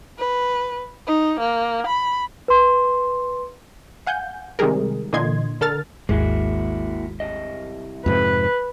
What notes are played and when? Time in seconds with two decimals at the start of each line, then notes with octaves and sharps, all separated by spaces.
0.19 B4
1.07 D#4
1.40 A#3
1.87 B5
2.48 B4 C6
4.07 F5 F#5 G#5 G6
4.59 C3 D#3 G3 G#3 G#4 A#4
5.13 A#2 D3 E3 D#5 C6 G#6
5.61 D3 A4 A#4 F6 A6
6.09 G#1 D#2 G#3 A#3 E4 F#4
7.20 C2 D#5
8.06 F2 G#2 C3 B4